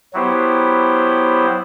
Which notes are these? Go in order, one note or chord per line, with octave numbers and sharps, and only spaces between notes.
F#3 B3 E4 G4 C5